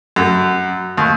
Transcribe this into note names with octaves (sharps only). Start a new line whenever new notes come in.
F#2
D#2